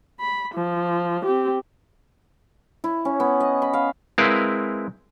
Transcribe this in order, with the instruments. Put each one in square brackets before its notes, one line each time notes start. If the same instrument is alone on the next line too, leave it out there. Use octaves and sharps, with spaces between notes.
[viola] B5
F3
C4 G4
[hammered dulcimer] E4
C#4
B3
D#5
B5
F5
[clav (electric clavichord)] G#3 C4 E4 A#4 B4 F5